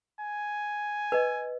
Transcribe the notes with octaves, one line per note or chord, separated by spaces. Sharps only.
G#5
B4 D#5